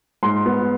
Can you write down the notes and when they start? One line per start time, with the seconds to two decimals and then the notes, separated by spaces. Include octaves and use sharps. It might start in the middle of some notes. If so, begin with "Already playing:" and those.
0.23 G#2 C6
0.46 B3